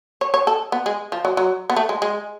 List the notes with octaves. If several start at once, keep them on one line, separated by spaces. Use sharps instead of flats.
C#5
C#5
A4
B3
G#3
F3
F#3
F#3
B3
A3
G#3
G#3